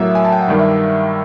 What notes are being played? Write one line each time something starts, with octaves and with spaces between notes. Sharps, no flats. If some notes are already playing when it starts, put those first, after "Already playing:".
Already playing: A2 F#3 A#3 E5
G#5
A5
G5
F#5
G2 D#3 G3 A#3
E5